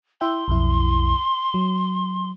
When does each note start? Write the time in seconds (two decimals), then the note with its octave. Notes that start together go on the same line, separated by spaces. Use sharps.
0.21 E4 E5 G5 C6
0.48 B1 F2 E4
1.54 F#3